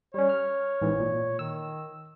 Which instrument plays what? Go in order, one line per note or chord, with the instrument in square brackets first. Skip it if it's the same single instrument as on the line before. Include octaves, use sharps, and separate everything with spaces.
[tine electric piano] G3 C#4 [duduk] C#5
[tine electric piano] F6
A1 G#2 E3
A#2
[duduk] D#3 [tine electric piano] E6